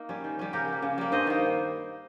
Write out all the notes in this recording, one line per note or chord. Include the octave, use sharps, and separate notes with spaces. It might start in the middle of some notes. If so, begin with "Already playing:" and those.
Already playing: A#3 D#4
G3 C#4
D#3
G3 C#4
C#3 G4 A#4
G3 A#3
C#3
G3 A#3
G2 C5 D#5
D#3 A#3